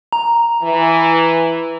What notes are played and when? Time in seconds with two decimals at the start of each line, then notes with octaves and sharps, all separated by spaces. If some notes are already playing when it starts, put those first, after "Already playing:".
0.13 A#5
0.62 E3